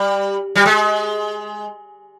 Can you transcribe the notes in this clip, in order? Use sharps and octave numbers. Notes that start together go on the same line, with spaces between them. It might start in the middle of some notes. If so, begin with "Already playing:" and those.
Already playing: G3
G3
G#3